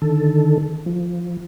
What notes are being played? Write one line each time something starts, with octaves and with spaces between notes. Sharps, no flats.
D3 D#3 A4
F3